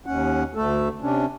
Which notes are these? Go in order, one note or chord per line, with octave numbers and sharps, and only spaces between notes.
D#2 C#4 F#5
D2 A3 A4
C3 C#4 D4